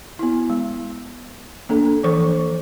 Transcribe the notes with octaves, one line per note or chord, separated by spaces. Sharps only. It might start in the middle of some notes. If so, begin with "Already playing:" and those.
B3 E4
G#3
A#3 D4 A4
E3 F3 A4 C5 C#6